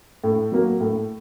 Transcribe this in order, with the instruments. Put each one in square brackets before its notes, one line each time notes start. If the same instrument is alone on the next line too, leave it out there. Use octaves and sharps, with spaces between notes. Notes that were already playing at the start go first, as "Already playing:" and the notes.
[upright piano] A2
F#3 A#3
A2